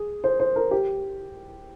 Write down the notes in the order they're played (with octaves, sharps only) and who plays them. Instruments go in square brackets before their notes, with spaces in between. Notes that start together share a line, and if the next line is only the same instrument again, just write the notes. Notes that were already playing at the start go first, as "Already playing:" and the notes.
Already playing: [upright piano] G#4
C5
C5
A#4
G4